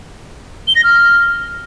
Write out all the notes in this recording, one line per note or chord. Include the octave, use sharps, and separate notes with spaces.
G7
A#6
F6